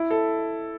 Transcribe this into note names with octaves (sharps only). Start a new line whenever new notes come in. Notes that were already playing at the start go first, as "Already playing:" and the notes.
Already playing: E4
A4